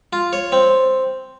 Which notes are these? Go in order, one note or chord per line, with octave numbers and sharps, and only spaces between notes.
F4
C#5
C4